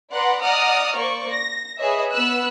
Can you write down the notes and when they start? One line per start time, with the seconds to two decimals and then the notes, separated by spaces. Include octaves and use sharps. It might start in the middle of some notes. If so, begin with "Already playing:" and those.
0.12 B4 D5 F#5 A#5 C6
0.42 D5 D#5 F#5 A#5 D#6 F6
0.97 A#3 C5 D5 C#6
1.33 A#6
1.78 G#4 B4 C#5 D#5 E5
2.13 B3 B4 E6 F#6